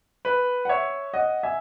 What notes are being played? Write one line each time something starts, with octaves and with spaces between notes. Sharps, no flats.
B4
F#5
C#5 E5
D#5 F#5
E5 G#5